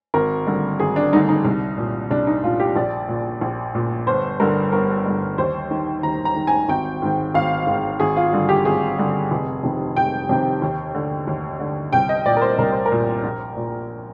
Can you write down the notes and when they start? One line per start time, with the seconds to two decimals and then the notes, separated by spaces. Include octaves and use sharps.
0.14 G#1 A#4
0.47 G2 D3
0.80 G#1 G#4
0.96 D4
1.13 G2 D3 D#4
1.29 D#4
1.45 C2
1.78 A#2
2.11 C2 D4
2.27 D#4
2.43 A#2 F4
2.60 G4
2.76 A#1 D5
3.08 A#2
3.41 A#1
3.75 A#2
4.07 G1 C5
4.40 G2 D3 A#4
4.72 G1 A#4
5.06 G2 D3
5.38 D#2 C5
5.71 D#3
6.03 D#2 A#5
6.25 A#5
6.36 D#3
6.47 G#5
6.69 G#1 G5
7.02 G#2 D#3
7.34 G#1 F5
7.67 G#2 D#3
8.00 G#1 G#4
8.16 F4
8.33 G2 D3
8.49 G4
8.65 G#1 G#4
8.99 G2 D3
9.31 F1
9.63 F2 C3 D#3
9.97 F1 G5
10.29 F2 C3 D#3
10.62 D#2
10.95 D3
11.27 D#2
11.60 D3
11.93 C2 G5
12.09 D#5
12.26 A#2 D5
12.37 A#4
12.42 C5
12.58 C2 A#4
12.72 C5
12.86 A#4
12.92 A#2
13.24 A#1
13.57 A#2